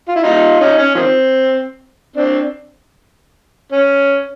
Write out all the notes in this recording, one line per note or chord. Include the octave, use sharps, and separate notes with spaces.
F4
E4
D#4 F4
C#4 D#4
C#4
D#3 F3 C4
C4 D4
C#4